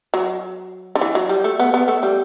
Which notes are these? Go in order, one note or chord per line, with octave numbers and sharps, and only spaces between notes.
F#3
D3
E3
F#3
G3
A3
B3
B3
A3
G3